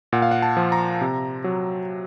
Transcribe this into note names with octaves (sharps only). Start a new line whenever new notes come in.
A#2 F#5
F5
F#5
A5
F3
A#5
C3
F#3